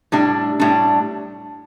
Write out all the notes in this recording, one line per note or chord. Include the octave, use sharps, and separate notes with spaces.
A2 G3 D4
A2 G3 D4